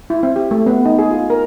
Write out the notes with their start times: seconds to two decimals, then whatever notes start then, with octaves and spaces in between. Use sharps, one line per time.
0.10 E4
0.23 C4
0.36 G4
0.51 A3
0.66 B3
0.85 D#4
0.98 G#4
1.11 F4
1.30 A#4